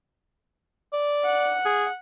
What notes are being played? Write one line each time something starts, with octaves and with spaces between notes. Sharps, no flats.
D5
F#5
G#4